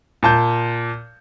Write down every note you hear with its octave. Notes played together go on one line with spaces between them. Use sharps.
A#2 A5 G6